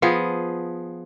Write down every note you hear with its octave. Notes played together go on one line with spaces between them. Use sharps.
F3 B3 G#4